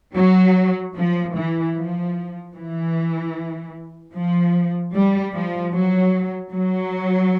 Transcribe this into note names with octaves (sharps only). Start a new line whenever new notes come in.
F#3
F3
E3
F3
E3
F3
G3
F3
F#3
F#3